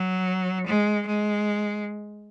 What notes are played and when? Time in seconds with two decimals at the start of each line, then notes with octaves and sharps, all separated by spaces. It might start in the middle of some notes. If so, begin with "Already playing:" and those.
Already playing: F#3
0.66 G#3
1.07 G#3